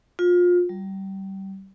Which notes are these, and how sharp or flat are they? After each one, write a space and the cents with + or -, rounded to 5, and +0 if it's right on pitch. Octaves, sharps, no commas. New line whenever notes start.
F4 +25
G3 -25